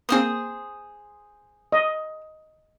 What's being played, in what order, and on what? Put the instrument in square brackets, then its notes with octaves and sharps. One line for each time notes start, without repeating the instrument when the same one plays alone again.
[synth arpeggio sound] A#3 C4 [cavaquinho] G#4 C5 D#6
[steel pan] D#5